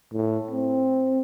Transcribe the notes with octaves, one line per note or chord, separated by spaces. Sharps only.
A2
C4